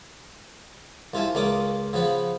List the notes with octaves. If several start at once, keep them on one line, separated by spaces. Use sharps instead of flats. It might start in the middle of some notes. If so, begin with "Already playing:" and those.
C2 F4 E5 G#5 A5
C#2 A#3 C#4 F4 D6 D#6
C#3 F3 B3 B4